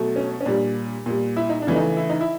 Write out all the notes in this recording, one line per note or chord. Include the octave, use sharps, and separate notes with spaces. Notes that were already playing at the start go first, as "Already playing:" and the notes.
Already playing: B2 F#3 A3
C#4
C#4
A#2 G3 D4
A#2 G3
E4
D#4
D4
C#3 E3 A3
D#4
E4
D#4
E4